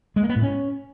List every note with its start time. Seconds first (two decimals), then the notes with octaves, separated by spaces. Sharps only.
0.16 G#3
0.23 A#3
0.29 B3
0.36 A2
0.43 C#4